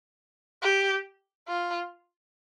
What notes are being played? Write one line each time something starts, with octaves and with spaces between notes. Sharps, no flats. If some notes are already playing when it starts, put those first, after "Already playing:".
G4
F4